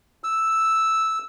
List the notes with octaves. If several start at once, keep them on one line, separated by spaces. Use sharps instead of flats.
E6